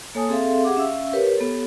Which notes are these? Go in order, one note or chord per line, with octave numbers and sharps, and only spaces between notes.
A#3 A4 C#5 G#5 A5 D#6
C4 G#4 A4 E5 F5 C6
G4 G#4 F#5 D6
C#4 E5 F5 E6
G4 A#4 B4 C#5
B3 G4 A4 C#5